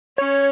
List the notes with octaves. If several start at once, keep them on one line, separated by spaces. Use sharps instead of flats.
C#4 C#5